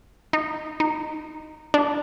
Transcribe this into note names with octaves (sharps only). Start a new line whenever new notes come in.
D#4
D#4
D4